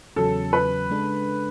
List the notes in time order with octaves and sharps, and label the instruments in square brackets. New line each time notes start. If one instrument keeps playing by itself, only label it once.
[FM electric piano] E2 C#3 F#3 C#4 [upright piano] A4
[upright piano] B4
[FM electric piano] C#3 G#3 D4 A4